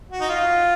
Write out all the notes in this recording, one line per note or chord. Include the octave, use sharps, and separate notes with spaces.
F#4
D#4
F4